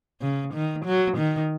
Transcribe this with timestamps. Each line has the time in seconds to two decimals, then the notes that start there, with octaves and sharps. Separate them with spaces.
0.22 C#3
0.54 D#3
0.85 F#3
1.17 D#3